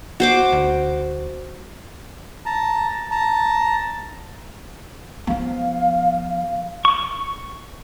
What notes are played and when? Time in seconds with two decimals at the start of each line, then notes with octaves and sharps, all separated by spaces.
0.20 F#4 C5 D6
0.52 D2
2.46 A5 A#5
3.11 A5 A#5
5.27 F3 B3 F5
6.85 C#6